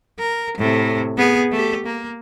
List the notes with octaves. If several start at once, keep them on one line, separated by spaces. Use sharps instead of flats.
A#4
A2 C3
B3 G#4
A3 G4
A#3